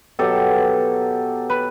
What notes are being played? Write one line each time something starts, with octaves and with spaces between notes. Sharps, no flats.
B2 F#3 G4 A4
B4